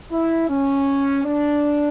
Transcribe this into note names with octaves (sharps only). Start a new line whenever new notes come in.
E4
C#4
D4